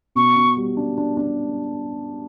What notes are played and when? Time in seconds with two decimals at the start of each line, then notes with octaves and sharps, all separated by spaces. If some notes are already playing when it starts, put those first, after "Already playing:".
0.15 B2 C#6
0.36 B2
0.57 G3
0.77 D4
0.98 D4
1.17 D4